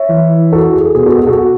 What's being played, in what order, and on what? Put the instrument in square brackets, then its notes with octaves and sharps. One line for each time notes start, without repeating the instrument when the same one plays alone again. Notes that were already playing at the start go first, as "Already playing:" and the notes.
Already playing: [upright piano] C#5 E5
[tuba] E3
[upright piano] F#4 A4
G#4
[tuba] B2 [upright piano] G#4
[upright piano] F#4 A4
G#4
F#4 A4